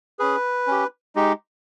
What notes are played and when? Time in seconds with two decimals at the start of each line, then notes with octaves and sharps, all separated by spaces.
0.19 C#4 G#4 B4
0.67 C#4 G4
1.16 G#3 D#4 G4